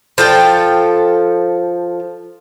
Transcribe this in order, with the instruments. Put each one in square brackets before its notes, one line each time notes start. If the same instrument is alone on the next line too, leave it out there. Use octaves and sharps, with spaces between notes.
[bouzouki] F3 A4 G5